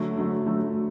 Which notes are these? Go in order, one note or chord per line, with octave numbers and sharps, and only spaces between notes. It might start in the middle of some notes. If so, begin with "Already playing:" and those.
Already playing: D3 F#3 A3
D3 F#3 A3
D3 F#3 A3